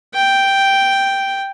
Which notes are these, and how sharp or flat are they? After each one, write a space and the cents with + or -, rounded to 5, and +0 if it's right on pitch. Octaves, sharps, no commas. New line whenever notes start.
G5 +0